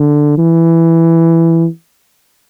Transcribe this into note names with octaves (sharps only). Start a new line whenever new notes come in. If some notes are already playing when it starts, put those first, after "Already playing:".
Already playing: D3
E3